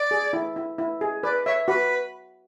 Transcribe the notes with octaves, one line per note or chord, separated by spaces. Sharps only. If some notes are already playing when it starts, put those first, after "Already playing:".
Already playing: D5
G#4
E4
E4
E4
G#4
B4 D5
C#5 E5
F#4 B4